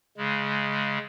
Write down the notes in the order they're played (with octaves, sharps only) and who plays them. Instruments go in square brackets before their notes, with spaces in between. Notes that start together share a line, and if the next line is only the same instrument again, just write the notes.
[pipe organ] C#3 G#3